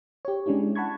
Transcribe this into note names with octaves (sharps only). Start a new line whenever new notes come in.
G4 C#5
G#3 C#4 D4 E4 G4
F#5 A5 B5 C#6 G#6